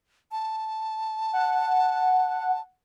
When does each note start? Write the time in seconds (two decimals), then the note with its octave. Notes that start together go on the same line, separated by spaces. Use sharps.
0.32 A5
1.33 F#5